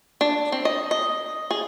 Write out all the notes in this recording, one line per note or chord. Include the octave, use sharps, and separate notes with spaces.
D4
C4
D#5
D#5
G#4